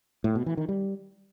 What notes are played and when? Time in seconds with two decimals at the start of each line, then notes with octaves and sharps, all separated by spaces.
0.24 A2
0.35 B2
0.46 E3
0.57 D#3
0.69 G3